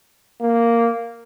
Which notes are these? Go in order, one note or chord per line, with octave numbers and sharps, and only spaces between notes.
A#3